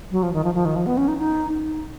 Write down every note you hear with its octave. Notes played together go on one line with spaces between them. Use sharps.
F#3
F3
D#3
F3
F3
D#3
F3
B3
C#4
D#4
D#4